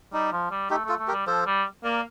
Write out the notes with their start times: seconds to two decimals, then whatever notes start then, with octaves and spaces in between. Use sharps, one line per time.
0.13 G3 D#4
0.32 F3
0.51 G3
0.70 A3 D#4 G4
0.85 A3 F4 A4
0.99 A3
1.08 G4 A#4
1.13 G3
1.27 F3 A4 C5
1.46 G3
1.84 A#3 A#4 D5